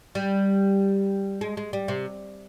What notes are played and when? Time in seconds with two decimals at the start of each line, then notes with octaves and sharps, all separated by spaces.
0.15 G3
1.41 G#3
1.57 G#3
1.73 G3
1.88 C3